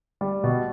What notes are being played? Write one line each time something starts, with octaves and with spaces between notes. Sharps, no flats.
G3
B2